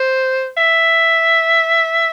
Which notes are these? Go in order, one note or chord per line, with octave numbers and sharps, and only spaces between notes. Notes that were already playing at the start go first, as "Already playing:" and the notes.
Already playing: C5
E5